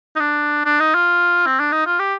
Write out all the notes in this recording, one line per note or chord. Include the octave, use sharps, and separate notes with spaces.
D#4
D4
D4
D#4
F4
C4
D4
D#4
F4
G4